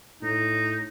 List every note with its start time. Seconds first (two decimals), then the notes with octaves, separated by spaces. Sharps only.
0.22 A2 D#4